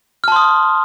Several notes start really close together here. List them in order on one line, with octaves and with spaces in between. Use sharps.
F6 A5 C6 D#6